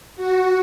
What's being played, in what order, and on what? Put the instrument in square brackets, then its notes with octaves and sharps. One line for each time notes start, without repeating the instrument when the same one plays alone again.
[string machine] F#4